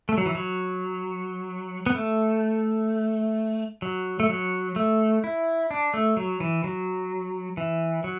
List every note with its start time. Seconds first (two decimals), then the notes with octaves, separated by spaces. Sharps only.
0.09 A3
0.18 F#3
0.26 E3
0.35 F#3
1.86 B3
1.95 A3
3.82 F#3
4.20 A3
4.30 F#3
4.76 A3
5.24 E4
5.71 D4
5.94 A3
6.17 F#3
6.40 E3
6.64 F#3
7.57 E3
8.04 F#3